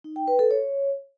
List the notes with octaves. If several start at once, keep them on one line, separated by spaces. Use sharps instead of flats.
D#4
G5
B4
A4
C#5